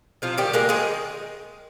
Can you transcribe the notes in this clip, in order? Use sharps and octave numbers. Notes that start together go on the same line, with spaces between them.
C3 F3 F4
D#3 G3 G4
G#3 A#3 A#4
D#3 G#3 G#4